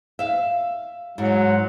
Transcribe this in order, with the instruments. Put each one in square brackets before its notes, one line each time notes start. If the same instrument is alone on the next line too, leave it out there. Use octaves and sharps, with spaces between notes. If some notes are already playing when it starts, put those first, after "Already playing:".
[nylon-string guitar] E5 F5
[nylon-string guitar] G#2 [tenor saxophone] F#3